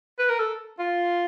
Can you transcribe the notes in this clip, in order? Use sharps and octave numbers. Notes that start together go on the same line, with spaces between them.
B4
A#4
A4
F4